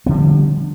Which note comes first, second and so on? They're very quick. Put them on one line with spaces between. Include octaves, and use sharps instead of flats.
B3 D3 F3 G3